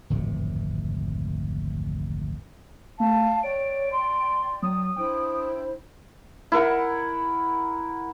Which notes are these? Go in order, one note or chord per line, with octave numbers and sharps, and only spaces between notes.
D1 G#1 F2 C3
A3 F5 A5
C#5 D5 G5 D7
C6
F#3 D#6
D4 E4 C5 G5
E4 A#4 F#5